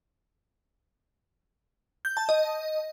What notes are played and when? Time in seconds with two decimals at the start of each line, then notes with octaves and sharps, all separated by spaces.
2.05 G6
2.17 A5
2.29 D#5